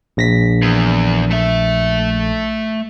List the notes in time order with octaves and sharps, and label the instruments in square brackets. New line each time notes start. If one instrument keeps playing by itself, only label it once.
[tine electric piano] A#1 A#6 B6
[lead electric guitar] E2
A3 E5